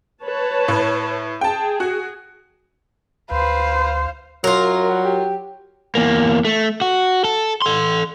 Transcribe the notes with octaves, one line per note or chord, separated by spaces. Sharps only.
B4 C#5 A5
A2
G#4 G5 A5
F#4
D2 B4 C5 F5
F#2 F#3 F4 A#4
G3 F#5
G4
E2 A#3
A3
F#4
A4
A4 C6